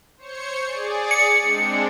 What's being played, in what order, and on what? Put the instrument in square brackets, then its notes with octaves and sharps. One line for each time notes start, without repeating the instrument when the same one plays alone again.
[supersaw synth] C5 C#5 C#7
G#4 D5
[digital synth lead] C#7
[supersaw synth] G#3 C4 D4